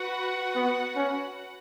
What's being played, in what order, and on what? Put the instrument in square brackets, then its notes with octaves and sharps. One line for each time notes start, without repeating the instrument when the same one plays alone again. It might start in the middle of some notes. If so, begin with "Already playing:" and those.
Already playing: [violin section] F#4 B4 F#5
[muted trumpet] B3
C#4